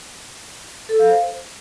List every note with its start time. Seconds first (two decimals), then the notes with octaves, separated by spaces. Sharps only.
0.89 A4
0.99 F5
1.10 C5